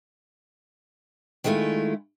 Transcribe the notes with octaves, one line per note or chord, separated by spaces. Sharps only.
D#3 G#3 A3 E4 F4